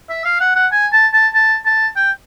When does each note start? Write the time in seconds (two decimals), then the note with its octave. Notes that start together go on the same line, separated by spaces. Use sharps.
0.10 E5
0.25 F5
0.40 F#5
0.56 F#5
0.72 G#5
0.92 A5
1.13 A5
1.34 A5
1.66 A5
1.96 G5